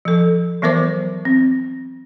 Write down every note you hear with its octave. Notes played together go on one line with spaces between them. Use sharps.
F3 A4
E3 F#3 B3 A#4 C5 D6
C4